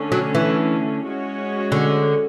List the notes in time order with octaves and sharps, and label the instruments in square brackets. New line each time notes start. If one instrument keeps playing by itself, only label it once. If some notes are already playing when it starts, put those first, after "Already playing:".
Already playing: [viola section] D3 A3 C#4
[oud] F#3
E3
[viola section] G#3 C#4 F#4 C#5
[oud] D3